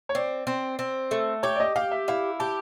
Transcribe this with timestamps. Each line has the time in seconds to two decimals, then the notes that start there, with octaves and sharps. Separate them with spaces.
0.09 C#5
0.15 C4 D5
0.47 C4
0.79 C4
1.11 A3
1.43 G4 C#5
1.56 D5
1.60 D#5
1.76 G4 F5
1.91 E5
2.08 E4 F5
2.40 G4 A5